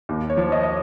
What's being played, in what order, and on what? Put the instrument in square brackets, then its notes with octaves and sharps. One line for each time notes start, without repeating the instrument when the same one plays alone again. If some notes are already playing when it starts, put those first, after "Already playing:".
[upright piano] D#2
C#5
F3
D#5
D#5